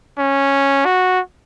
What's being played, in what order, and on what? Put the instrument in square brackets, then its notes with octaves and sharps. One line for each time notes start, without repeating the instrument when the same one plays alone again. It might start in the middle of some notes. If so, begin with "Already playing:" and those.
[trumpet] C#4
F#4